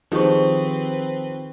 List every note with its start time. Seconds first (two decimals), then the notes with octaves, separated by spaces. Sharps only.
0.12 D#3 F3 C4 G4 G#4 B4 C5 C#6